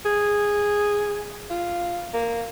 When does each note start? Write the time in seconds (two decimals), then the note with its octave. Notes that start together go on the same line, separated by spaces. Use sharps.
0.06 G#4
1.50 F4
2.13 A#3